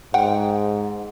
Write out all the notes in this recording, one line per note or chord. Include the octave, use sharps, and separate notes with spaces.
G#2 F#5 G5